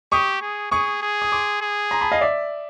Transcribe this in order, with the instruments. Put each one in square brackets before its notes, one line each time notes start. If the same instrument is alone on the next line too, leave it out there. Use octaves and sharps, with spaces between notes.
[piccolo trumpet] G4 [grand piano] C#6 D#6
[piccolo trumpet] G#4
[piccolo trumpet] G#4 [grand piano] C#6 D#6
[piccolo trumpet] G#4
[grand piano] D#6
C6 D6
[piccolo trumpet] G#4
[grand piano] A#5 C6
A5 B5
D#5 F5
D5 E5